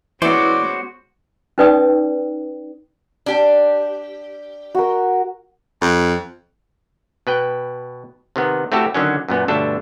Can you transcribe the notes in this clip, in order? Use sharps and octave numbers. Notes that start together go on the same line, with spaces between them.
E3 G#3 B3 C#4 F#4 C5 D5 E6
C#4 D#4 B4 D5 G5 D#6
D4 G4
F#4 A#4
F2
B2 B4 G5
C3 D#3 B3
A3 C4 E4 F#4 G4 A4
D3 D#3 F#3 C#4
F#2 A#2 B3
G1 B2 A3 D4 A4